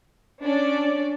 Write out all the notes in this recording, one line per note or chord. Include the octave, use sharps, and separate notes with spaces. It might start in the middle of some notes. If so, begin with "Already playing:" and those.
C#4 D4 D5